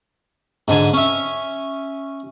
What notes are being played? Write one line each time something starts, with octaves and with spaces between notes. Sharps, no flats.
G#2 D3 G#5 A5
C#4 E5